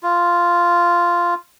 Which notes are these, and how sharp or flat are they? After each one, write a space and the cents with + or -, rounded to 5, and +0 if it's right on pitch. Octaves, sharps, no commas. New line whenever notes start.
F4 -5